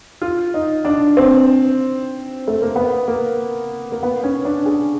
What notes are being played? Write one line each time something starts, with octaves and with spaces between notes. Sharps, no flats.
F4
D#4
D4
C4
A3
A#3
B3
A#3
A#3
B3
C#4
D4
G#4